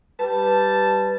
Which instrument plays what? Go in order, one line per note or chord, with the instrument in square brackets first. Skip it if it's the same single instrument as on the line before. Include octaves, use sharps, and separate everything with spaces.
[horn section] G3 A5 [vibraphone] B4